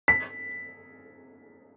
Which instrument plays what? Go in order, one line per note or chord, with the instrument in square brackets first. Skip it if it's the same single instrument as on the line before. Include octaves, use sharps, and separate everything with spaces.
[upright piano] B6